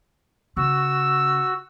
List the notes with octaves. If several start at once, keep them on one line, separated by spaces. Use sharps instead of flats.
C#3 F#4 E6